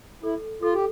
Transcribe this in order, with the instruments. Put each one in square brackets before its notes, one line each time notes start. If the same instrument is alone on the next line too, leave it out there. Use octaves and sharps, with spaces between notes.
[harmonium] E4 [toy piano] A4
[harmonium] F4 [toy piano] A4
[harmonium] G4